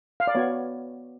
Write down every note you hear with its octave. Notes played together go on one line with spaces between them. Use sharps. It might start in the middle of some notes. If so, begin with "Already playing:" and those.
F5
D5
B3 F#4 C#5